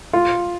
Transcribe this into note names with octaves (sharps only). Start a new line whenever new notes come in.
F4